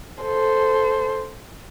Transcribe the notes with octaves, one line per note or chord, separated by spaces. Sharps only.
A4 C5